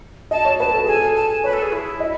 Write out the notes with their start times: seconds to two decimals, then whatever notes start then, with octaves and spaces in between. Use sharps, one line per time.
0.31 D#5 A5
0.45 C#5
0.60 B4 A5
0.73 A4
0.84 G#4 G#5
0.94 A4
1.16 A5
1.30 G#5
1.44 B4 C#5
1.53 A4
1.62 G#4
1.72 E4
2.00 D#5